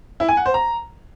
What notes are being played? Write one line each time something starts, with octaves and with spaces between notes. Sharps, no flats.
E4
G#5
F#5
C5
A#5